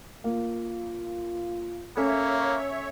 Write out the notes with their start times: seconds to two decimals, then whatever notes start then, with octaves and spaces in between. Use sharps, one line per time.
0.24 A#3 F4
1.97 A#3 C#4 A4 C#5 E5